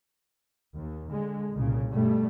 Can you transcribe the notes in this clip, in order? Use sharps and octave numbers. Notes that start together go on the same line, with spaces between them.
D#2
D3 G#3
C2 A#2 C#3
G2 B2 G3 A3